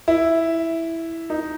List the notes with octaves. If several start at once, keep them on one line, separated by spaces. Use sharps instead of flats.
E4
D#4